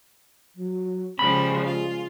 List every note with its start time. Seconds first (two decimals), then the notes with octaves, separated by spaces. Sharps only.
0.56 F#3
1.19 C#3 F3 G3 G#3 B5
1.64 F4